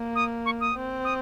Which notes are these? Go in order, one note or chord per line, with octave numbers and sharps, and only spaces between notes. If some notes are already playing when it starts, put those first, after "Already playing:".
Already playing: A#3
D#6
C#6
D#6
C4
D#6